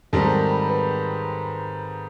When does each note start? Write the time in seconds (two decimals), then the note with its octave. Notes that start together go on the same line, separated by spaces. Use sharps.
0.13 G#2 D#3 G3 C4 A4 A5
0.25 A#4 A#5
0.38 A#4 A#5
0.51 B5
0.61 A#5
0.69 B4 B5